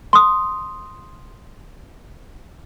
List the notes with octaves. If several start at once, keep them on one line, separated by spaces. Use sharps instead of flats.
C6 D#6